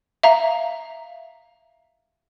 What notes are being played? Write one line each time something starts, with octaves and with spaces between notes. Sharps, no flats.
E5 F5 A#5